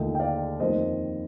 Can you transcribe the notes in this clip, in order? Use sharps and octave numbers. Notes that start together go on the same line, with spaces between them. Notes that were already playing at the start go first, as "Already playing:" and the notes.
Already playing: D#2 D3 A3 D4 F4 D#5 G5
G5
D5 F5
F2 D#3 A#3 C5 D#5